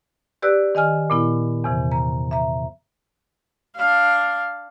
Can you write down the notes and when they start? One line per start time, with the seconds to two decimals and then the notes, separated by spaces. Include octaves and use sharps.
0.42 G4 B4 D5 E6 F#6
0.75 D#3 D#5 G#5 F6
1.10 A#2 B3 E4
1.64 E2 C3 E3
1.92 A#5
2.31 E5 A#5
3.76 D4 F5